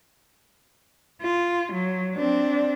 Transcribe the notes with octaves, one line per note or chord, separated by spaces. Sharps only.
F4
F#3
C4 D4